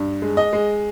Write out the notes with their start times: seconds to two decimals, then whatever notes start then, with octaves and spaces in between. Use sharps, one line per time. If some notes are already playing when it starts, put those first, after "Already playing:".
Already playing: G2
0.22 G#3
0.37 D#5
0.53 G#3